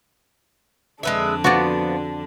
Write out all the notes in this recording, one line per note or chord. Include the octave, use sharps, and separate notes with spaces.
F2 D3 G#3 D4 B4 E5
F3 B3 F#4 D5 F#5